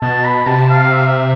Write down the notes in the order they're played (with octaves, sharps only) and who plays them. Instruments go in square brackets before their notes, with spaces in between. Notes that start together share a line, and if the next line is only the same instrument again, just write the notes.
[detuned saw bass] B2 [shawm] A5
[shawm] B5
[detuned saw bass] C3 [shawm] A5
[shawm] F5
E5
F5
E5